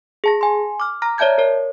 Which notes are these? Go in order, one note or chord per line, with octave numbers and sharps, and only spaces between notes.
G#4 A5 A#6
G#5 C6
D6 F6
A#5 F6 A#6
C#5 D5 E5 A5 G6 G#6
A#4 C#5